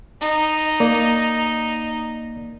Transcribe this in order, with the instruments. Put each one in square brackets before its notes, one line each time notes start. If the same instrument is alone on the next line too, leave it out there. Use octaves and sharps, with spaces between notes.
[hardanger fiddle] D#4
[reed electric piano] A#3 D5